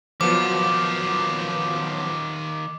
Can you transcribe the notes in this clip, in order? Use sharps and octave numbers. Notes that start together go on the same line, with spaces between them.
D#3 F3 F#3 B3 F4 D6